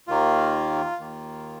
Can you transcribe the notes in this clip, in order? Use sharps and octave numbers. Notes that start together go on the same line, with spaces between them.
D#2 D#3 A#3 F4
D#2 D#3 A#3